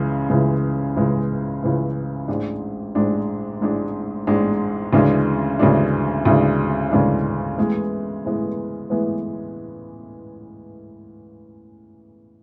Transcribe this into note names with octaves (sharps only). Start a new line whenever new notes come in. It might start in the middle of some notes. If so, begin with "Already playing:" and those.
Already playing: C#2 C#3 E3 G#3
C#2 C#3 E3 G#3
C#2 C#3 E3 G#3
C#2 C#3 E3 G#3
A1 G#2 G#3 D4
A1 G#2 G#3 D4
A1 G#2 G#3 D4
A1 G#2 G#3 D4
D2 C#3 E3 G#3 D4
D2 C#3 E3 G#3 D4
D2 C#3 E3 G#3 D4
D2 C#3 E3 G#3 D4
A2 E3 G#3 B3
A2 E3 G#3 B3
A2 E3 G#3 B3